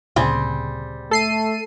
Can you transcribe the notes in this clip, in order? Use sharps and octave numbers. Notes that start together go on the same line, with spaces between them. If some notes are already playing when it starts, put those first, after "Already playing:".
D2 A#2 C#3 G3 C4 G#4
A3 A4 C7 D#7